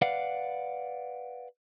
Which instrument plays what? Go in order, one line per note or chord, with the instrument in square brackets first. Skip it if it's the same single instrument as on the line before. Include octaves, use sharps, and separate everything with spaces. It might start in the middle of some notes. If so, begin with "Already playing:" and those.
[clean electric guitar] B4 D5 F5 F#5